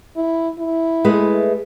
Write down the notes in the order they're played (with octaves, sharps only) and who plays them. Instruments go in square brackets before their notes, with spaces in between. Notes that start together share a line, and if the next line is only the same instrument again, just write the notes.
[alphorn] E4
E4
[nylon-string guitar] G#3 A3 B4